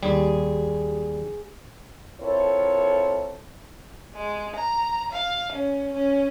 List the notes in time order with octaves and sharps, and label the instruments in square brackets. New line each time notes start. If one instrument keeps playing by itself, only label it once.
[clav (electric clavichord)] D#2 G3 [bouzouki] G#4
[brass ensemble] C4 E4 F4 A4 A#4 C#5
[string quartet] G#3
A#5
F5
C#4
C#4